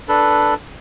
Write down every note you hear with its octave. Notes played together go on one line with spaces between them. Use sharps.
D4 A4 B4